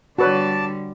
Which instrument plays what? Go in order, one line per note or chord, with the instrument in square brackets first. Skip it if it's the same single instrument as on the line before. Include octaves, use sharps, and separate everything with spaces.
[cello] D3 G3 [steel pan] F#4 B4 C#5 [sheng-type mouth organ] D5 A5